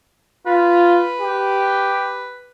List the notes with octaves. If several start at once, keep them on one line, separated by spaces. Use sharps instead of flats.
F4 B4
G4